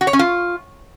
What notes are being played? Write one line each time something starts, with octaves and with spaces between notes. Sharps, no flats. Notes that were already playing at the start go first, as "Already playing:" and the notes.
F#4
C#5
C#4
F4